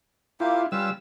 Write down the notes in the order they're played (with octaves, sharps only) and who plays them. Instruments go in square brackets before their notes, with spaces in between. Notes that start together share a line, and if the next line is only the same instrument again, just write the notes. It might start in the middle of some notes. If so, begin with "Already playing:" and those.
[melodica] A#3 G4 [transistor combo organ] E4 F4
[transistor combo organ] G3 E6 [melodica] C#4 F4 B4